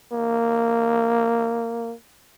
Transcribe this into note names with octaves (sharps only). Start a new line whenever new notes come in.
A#3